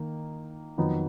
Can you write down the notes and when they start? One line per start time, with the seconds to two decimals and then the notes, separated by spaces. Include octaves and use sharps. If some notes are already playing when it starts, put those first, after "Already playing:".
Already playing: D#3 A#3 D#4
0.77 F2 D#3 F#3 B3 D#4